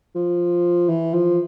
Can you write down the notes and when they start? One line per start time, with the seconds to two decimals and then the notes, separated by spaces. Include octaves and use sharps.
0.15 F3
0.89 E3
1.14 F3